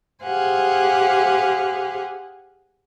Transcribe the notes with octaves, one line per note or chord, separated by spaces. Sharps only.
G4 G#4 C5 F5 F#5 G#5